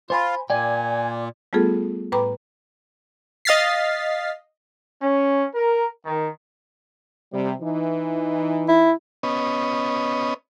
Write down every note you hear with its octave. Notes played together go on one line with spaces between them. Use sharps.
F4 C5 G#5 B5
A#2 D5 G5 G#5
G3 A3 B3 F4 G#4 A4
A2 B4 G5 A#5 B5 D6
D#5 F5 F6 A6 B6 C7
C#4
A#4
D#3
C3 G3
E3 D#4
E4
B3 C#4 D#5